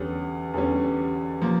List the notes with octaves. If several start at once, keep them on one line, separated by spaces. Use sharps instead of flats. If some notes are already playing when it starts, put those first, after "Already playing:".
Already playing: E2 D3 G3 C#4
E2 D3 G3 C#4
F3 A#3